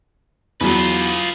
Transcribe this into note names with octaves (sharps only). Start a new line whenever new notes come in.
E2 F#3 F4 B4